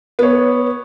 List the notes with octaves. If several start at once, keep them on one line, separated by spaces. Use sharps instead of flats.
B3 C#5